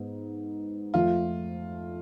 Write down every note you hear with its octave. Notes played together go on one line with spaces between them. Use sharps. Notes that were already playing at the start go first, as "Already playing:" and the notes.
Already playing: G#2 B3
F2 F3 A3 F4